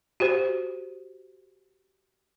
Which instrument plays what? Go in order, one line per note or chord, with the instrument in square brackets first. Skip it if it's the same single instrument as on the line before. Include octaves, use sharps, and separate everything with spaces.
[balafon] F#4 G4 C5